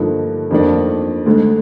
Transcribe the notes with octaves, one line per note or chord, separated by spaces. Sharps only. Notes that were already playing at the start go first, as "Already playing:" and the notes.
Already playing: G2 D3 F3 A#3 D#4
F2 D#3 A#3 D4
D2 D3 G#3